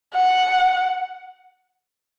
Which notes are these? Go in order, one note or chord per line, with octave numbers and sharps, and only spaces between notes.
F#5